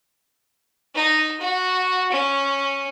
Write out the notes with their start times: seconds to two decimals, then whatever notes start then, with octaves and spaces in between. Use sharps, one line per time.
0.95 D#4
1.40 F#4
2.12 C#4